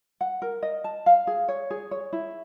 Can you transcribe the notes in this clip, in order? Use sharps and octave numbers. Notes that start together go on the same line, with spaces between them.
F#5
A#4
D#5
A5
F5
G#4
C#5
G#4
C#5
E4